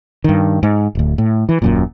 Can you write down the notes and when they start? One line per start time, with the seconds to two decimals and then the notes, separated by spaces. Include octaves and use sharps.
0.24 G2 D#3
0.63 G#2
0.95 D1 D2
1.18 A2
1.49 E3
1.62 D#1 F#2 A#2